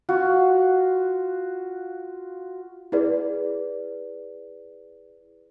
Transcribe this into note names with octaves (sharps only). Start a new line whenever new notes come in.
F4 F#4
E4 G#4 B4 D5